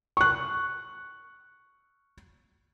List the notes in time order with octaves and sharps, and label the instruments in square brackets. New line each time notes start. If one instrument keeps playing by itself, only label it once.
[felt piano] C#6 F#6